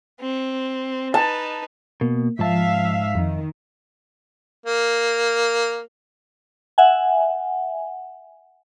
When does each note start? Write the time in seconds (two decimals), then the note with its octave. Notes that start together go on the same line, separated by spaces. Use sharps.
0.20 C4
1.14 D#4 B4 A5
2.01 B2 A#3
2.39 G#2 F3 E5 F5 A5
3.15 F2 D#3
4.66 A#3
6.78 E5 F#5 G#5